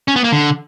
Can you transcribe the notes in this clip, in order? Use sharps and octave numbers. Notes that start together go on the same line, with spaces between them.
C#4
B3
A#3
D3